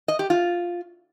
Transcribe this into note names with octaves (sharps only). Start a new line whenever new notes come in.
D#5
G4
F4